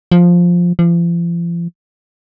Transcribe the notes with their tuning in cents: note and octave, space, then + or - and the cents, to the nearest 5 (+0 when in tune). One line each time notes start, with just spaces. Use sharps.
F3 +5
F3 -40